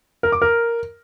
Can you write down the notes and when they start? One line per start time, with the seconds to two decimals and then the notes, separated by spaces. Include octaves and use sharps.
0.23 A#4
0.32 D6
0.42 A#4